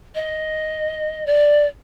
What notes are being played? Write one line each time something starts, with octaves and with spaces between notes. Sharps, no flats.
D#5
D5